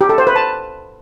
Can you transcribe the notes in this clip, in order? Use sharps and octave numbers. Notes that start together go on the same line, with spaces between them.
G4
A4
C5
B4
A5